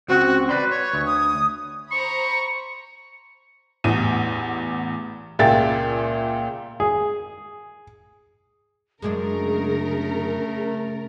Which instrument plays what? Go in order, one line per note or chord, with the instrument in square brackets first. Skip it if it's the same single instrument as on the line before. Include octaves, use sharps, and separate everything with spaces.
[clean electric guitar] C#2 C4 F#5 [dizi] F#4
[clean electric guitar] B4 B5 C6 [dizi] D5
[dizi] C#5
[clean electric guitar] D2
[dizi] D#6
[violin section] C5 A#5 B5 [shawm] C#6
[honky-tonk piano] A1 E2 D#7
C#2 A#2 G#4 E5 G5 A6
[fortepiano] G#4
[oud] F#2 G#3 D4 [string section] C#3 A#4 [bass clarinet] A3 [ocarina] G#4